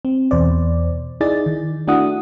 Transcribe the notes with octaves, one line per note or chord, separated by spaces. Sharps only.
C4
E2 B2 C5 D5
D#4 E4 G#4 D5 A6
D#3
A3 D4 E4 F#4 F#5 D#6